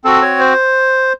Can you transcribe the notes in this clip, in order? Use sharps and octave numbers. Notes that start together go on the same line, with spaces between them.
C4 F#4 A4
C#5
C5